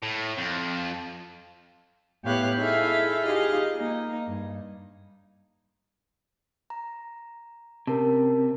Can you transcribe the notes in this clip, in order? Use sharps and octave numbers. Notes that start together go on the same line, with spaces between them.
A2
F2
A2 B3 G4 C#5 F5 F#6
D#4 E4 G#4 A4 E5 F5
D#4 F4 G4 G#4 D#5 F5
A#3 D#4
G2
A#5
C3 C#4 A#4 A5